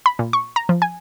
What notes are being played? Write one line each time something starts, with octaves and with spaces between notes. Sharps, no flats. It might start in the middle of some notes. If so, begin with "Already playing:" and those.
B5
A#2
C#6
A#5
F3
G#5